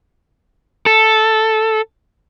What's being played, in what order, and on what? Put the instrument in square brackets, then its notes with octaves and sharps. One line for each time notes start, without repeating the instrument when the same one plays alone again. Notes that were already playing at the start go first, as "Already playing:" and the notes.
[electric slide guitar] A4